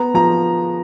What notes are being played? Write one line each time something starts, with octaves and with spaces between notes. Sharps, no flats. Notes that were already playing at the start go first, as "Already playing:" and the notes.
Already playing: B3 A#5
F3 A#5